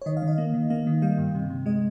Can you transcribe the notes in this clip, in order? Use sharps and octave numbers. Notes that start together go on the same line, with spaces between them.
C#5
D#3 D#5
F5
D#3
D#5
A#3
D#3
A#3 F5
D#3
G3 F5
G2
C3
C3
G#3 D#5